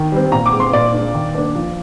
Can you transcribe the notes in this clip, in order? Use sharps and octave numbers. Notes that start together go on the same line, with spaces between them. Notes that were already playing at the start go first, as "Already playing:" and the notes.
Already playing: D#3
G3 C4
A#2 A#5
D6
G#3 C4
C6
A#2 D5
G#3 D4
D#3
A#3 D4
F3